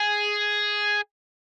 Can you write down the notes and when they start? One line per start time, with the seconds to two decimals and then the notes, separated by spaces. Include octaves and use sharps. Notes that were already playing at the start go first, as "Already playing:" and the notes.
Already playing: G#4